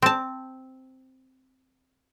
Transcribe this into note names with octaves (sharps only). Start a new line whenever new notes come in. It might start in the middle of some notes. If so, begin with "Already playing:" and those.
C4 A5